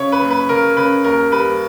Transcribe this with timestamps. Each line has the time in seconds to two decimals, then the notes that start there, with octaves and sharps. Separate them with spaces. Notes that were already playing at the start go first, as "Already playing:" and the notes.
Already playing: C#3 C#5
0.12 B4
0.21 F#1
0.31 B4
0.49 C#3 A#4
0.77 C#3 B4
1.04 D#2 A#4
1.31 G3 B4